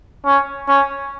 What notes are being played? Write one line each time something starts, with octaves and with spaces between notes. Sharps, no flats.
C#4
C#4